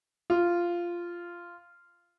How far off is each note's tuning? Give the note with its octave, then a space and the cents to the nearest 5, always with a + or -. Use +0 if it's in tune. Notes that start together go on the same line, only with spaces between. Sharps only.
F4 -10